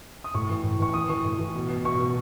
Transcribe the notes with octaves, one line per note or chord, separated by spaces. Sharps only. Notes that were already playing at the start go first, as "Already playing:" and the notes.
D#6
A2 C#6
E3
A2
E3 C#6
E3 D#6
E3 C#6
A2
E3
B2
B2
B2 C#6
B2